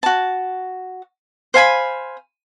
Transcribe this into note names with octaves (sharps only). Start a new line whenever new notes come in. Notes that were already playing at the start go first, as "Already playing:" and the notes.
F#4 A5
C5 F5 G#5 B5